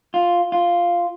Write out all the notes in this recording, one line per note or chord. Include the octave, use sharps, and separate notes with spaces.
F4
F4